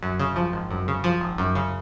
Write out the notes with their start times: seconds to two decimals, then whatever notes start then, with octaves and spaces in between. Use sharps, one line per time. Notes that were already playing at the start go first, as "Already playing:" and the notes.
0.03 F#2
0.20 C#3
0.36 F3
0.53 G#1
0.71 F#2
0.88 C#3
1.04 F3
1.21 G#1
1.38 F#2
1.55 C#3